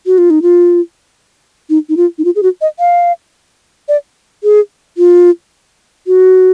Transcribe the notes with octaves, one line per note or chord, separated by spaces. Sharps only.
F#4
F4
D#4
F4
D#4
D#4
F4
D#4
F4
G#4
F#4
D#5
F5
D5
G#4
F4
F#4